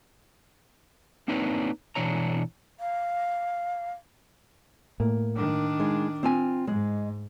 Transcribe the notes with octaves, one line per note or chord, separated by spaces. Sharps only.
A#3 C4 D4 D#4 B4 C#5
B2 E3 D4 C#5 A#5
F5
A2 A#3
D#3 D4
G#3 D#4
C4 F4 G#5
G#2 G#3